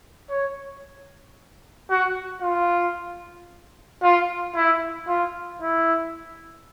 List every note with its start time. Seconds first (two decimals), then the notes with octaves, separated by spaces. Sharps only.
0.30 C#5
1.90 F#4
2.42 F4
4.02 F4
4.55 E4
5.08 F4
5.62 E4